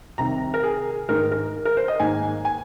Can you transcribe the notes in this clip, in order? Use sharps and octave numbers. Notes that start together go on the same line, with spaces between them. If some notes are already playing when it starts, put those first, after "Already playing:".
C2 C3 D#3 A#5
A#4
G#4
G#2 D#3 G#3 D#4 A#4
A#4
A#4
C5
D#5
G#2 D#3 A#3 D#4 G#5
G#5